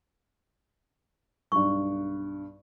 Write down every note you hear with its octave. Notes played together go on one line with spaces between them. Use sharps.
B1 G2 C#6